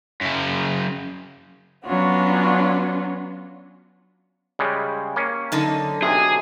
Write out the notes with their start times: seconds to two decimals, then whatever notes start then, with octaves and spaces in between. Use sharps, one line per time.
0.21 F#2 C#3
1.84 F#3 B3 C#4 D4 F4 F#4
4.59 C#3 G3 G#3
5.16 A#3 C#4
5.52 F#2 D3 D#4
6.03 B1 C3 G#4